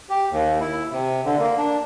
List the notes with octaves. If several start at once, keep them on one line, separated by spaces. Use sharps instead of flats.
G4
D#2
E4
C3
D3
A#3
D4